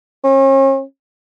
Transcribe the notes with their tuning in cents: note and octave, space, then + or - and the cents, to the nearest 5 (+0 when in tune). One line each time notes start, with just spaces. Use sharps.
C#4 -40